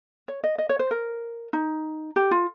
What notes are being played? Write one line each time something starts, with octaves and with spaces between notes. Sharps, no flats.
C#5
D#5
D#5
C#5
C5
A#4
D#4
G4
F4